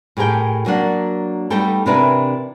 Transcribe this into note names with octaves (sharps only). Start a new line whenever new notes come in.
A2 G4 G#4 A#4 G5
F#3 A#3 D4 F#5
G3 A3 B3 D#4 A4 G5
C3 E3 D4 E4 A#4 B4